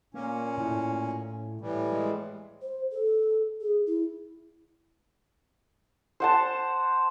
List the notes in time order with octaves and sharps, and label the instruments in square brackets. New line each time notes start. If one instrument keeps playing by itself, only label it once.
[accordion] A#2 C#4 [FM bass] A#3
[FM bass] A2
[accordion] A2 E3 G3
[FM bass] G#3
[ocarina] C5
A4
G#4
E4
[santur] C5 F#5 A5